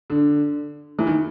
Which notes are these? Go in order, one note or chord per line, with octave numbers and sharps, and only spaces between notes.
D3
E3
D#3